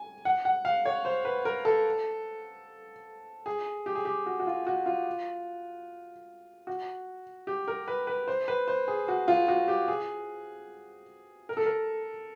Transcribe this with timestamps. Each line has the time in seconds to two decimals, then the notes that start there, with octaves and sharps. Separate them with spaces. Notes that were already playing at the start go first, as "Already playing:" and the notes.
Already playing: G#5
0.25 F#5
0.45 F#5
0.65 F5
0.85 C#5
1.05 C5
1.25 B4
1.45 A#4
1.65 A4
3.46 G#4
3.86 G4
3.95 G#4
4.05 G4
4.26 F#4
4.40 F#4
4.47 F4
4.67 F#4
4.86 F4
6.67 F#4
7.47 G4
7.68 A#4
7.88 B4
8.07 B4
8.28 C5
8.48 B4
8.68 C5
8.88 G#4
9.08 F#4
9.28 F4
9.48 F#4
9.68 G4
9.88 G#4
11.49 A#4
11.57 A4
11.66 A#4